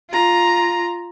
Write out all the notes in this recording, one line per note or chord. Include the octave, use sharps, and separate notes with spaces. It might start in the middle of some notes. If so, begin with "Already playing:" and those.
F4 A#5